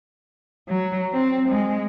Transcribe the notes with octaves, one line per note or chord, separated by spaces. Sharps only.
F#3
C4
G#3